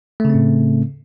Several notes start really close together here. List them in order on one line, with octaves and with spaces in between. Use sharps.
A3 C#3 C4 A2